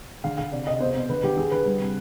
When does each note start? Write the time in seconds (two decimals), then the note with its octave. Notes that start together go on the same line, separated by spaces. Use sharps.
0.24 D3 F5
0.38 D3 F5
0.52 C3 D5
0.67 C3 D#5
0.80 B2 C5
0.94 B2
1.09 D3 B4
1.23 D3 G4
1.37 D3 G#4
1.51 D3 B4
1.66 G3
1.80 C3